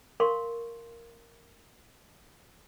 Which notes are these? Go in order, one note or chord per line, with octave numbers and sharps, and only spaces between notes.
A#4 F5 C6 C#6